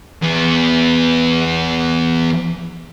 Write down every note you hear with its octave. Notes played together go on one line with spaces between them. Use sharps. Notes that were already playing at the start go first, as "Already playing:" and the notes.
E2 B3